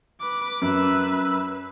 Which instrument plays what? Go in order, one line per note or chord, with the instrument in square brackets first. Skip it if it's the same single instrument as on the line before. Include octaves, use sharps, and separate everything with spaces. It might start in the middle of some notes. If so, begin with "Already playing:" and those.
[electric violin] B4 D6
[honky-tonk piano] F#2 [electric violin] B4 E6